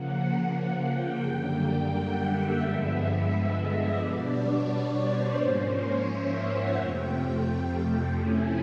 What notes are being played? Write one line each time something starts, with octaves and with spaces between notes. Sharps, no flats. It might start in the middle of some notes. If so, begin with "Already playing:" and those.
Already playing: C#3 F3 A#3 F#5
G5
F#2 D3 G3 A#3
F#5
E5
G2 D3 F3 G#3 B3
E5
D#5
B2 G3 B3 D4 D5
C#5
D5
C5
G#2 F3 A#3 C#4
C#5
E5
F#5
F2 C3 F3 A3 G5
G5
C3 F3 A3 C#4 E4 G#5